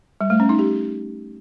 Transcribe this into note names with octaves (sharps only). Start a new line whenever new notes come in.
G3
A3
C#4
D#4
G4